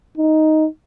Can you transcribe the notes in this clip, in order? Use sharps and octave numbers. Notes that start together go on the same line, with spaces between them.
D#4